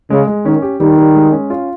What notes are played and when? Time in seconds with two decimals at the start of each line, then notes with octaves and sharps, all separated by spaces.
0.10 C#3 G#3
0.27 G#3
0.45 D#3 C#4
0.62 G4
0.80 D#3 G3
0.97 G3
1.15 G#3
1.32 C#4
1.50 F4